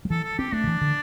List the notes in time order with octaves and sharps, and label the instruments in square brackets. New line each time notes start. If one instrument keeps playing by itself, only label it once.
[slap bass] G3
[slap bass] E3 [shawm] A4
[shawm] A4
[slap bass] C4 [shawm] G4
[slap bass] A3 [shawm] D4
[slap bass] D3
E3
D3